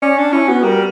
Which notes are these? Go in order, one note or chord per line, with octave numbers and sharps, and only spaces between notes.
C#4 D5
D4
C#4 E4
B3 F#4
G3 A#4